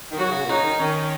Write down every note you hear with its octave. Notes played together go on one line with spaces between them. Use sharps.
D#3
F#3 F#4
C#3
C#3
A#2
C#3 D#4
D#3
D#3 C#4